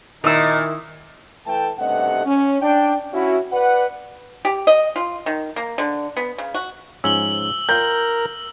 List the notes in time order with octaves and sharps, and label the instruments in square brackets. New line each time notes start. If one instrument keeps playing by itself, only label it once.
[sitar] A#2 [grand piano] D#3 E4 [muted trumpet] D#4 [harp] D#6 E6
[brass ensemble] E3 A3 G5 A5
B1 G2 C3 A3 D#5 F#5
C#4
D4 G5
C#4 E4 F#4
B4 D5 F#5
[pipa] G4
D#5
F4
D#3
A#3
D3
B3
C#3
F#4
[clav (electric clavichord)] G#2 F3 C#4 [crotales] E6 F#7 G7
[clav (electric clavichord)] F4 G5 [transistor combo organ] A#4 [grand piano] G6